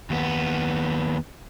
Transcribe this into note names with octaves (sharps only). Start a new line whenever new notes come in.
D#2 B3